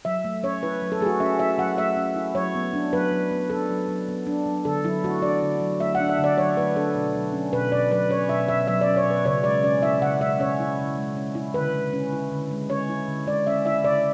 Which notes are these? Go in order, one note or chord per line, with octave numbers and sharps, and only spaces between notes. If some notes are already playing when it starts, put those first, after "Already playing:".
F#3 E5
A3
C#4 C#5
E4 B4
F#3
A4
A3 G#4
F#4
C#4 E5
E4 E5
F#3 F#5
A3 E5
C#4
E4
F#3 C#5
B3
D4
F#3 B4
F#3
B3
D4 A4
F#3
F#3
B3
D4
F#3
D3 A4
F#3 E4
A3 F#4
D4 D5
D3
F#3
A3 E5
F#5
D4
E5
D3
D5
F#3 C#5
A3 B4
D4 A4
B2
F#3
C#4
B2 B4
B2 D5
F#3 B4
C#4 C#5
B2 E5
B2 E5
F#3 E5
D5
C#4
C#5
B2
B4
C#3 C#5
G#3 D5
C#4 D5
E4 E5
C#3 F#5
G#3 E5
C#4 C#5
E4
C#3
G#3
C#4
E4
D3 B4
G#3
C#4
E4
D3
G#3
C#4 C#5
E4
D3
G#3 D5
C#4 E5
E4 E5
C#3 D5